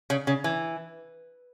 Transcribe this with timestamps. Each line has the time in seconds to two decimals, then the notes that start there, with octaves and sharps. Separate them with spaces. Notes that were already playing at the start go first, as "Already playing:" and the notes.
0.10 C#3
0.27 C#3
0.44 E3